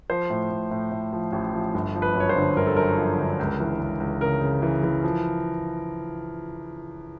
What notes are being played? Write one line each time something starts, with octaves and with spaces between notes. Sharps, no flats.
F3 C5
A2
A2
A2
A2
F3
A1
F3
G1
F3
B4
F#2 C#5
C5
D3
G1 A#4
A4
F#2 A#4
F3
D3
C#2
E3
C#2
C#2
C#3 A#4
C#3
E3
E3
F3